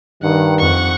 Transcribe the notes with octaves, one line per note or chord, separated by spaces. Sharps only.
G2 D#3 F#5
F2 F#5 C#6